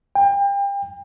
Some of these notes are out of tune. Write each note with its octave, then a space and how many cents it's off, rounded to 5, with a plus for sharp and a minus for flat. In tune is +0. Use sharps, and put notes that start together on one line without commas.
G5 +35